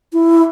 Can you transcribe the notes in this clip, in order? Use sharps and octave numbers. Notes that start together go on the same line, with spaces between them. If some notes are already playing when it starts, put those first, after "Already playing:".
E4